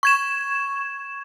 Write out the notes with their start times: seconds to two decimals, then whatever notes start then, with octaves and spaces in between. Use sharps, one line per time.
0.03 C#6 G#6 E7